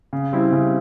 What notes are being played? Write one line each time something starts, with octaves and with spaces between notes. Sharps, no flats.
C#3
G3 C4 E4
C#3